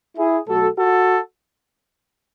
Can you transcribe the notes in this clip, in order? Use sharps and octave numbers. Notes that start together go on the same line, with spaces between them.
E4 G#4
B2 F#3 A3 F#4 A4
F#4 A4